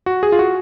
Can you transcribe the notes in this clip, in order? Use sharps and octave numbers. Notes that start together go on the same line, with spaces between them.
F#4
G#4
F4
F#4